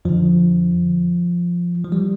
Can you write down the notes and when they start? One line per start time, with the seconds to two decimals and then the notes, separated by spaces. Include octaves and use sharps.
0.05 F2 D3 F3
1.85 F3
1.92 E3 G3